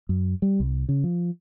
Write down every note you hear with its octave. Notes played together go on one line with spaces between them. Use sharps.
F#2
G3
C2
C#3
F3